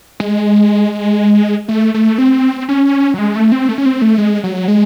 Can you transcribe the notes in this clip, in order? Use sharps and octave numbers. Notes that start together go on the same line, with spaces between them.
G#3
A3
A3
C4
C#4
F#3
G#3
A3
C4
A3
C#4
C4
A3
G#3
F#3
G#3